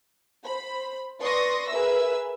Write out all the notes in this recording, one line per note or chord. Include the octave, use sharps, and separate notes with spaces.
C5 B5
B4 D5 C6 C#6 D#6 A#6
G#4 A#4 B4 E5 E6